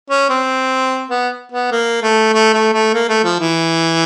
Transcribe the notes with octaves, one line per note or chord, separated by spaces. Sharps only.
C#4
C4
B3
B3
A#3
A3
A3
A3
A3
A#3
A3
F3
E3